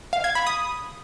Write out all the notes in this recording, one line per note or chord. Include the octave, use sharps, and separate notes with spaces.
F5
G#6
B5
D#6